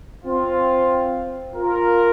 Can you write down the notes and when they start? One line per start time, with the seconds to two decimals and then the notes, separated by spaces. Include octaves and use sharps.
0.25 C4 F4
1.55 F4 A#4